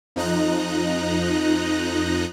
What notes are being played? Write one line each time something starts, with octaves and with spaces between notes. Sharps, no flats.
F2 F3 D#4 D#5 A#5 F#6